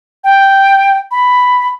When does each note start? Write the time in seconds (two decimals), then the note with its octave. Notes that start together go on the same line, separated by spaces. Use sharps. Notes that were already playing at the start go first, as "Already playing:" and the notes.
0.24 G5
1.11 B5